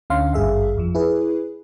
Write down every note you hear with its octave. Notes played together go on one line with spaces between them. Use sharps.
D2 D3 C#4 F5 C6
G#1 G2 G#4 E5 F5
C2 F2 F3
E4 G#4 B4